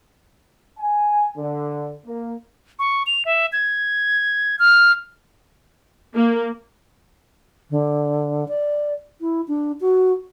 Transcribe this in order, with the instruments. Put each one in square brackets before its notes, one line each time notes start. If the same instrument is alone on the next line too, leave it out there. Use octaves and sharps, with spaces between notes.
[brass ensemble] G#5
D3
A#3
[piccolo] C#6
F7
E5
G#6
F6
[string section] A#3
[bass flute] D3
D5
E4
D4
F#4